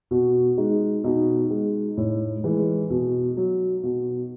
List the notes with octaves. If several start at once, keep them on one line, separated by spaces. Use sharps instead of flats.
B2 F#4
G#3 D#4
B2 D#4
G#3
A2
E3 G#3
B2
F#3
B2